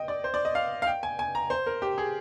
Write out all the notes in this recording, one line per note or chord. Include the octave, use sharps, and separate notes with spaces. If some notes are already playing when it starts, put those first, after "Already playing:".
Already playing: D#5 G5
D5
C5
D5
D#5
F5
F5
G5
G#5
G#5
A#5
C5
A#4
G4
G#4